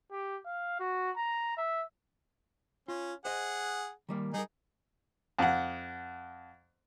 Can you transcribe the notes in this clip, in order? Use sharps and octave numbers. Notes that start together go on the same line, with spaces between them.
G4
F5
F#4
A#5
E5
C#4 F4
G#4 C5 D#5 F#5
D#3 G3 A#3
G3 D#4 G#4 A#4
F2 F#5